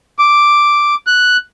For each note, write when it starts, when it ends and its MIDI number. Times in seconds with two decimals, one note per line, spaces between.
0.19 0.95 86
1.07 1.37 90